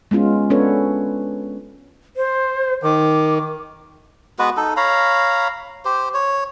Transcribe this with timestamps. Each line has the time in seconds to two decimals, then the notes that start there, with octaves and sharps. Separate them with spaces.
0.11 G#3 B3 C#4 F4
0.50 B3 C#4 D4 A4 B4 C#5
2.17 C5
2.83 D#3 D6
4.39 G#3 B3 F#4 B4
4.57 D#4 A4
4.77 C#5 F5 A#5 B5
5.85 G4 C5
6.14 C#5